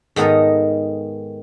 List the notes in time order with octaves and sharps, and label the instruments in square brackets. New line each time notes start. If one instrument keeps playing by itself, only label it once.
[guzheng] G#2 D#3 B3 A4 A#4 D#5